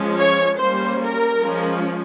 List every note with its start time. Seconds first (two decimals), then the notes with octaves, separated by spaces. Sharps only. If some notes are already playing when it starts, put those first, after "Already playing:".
Already playing: F3 G#3 C#4
0.18 C#5
0.59 G3 A#3 C#4 C5
1.01 A#4
1.41 F3 G#3 C#4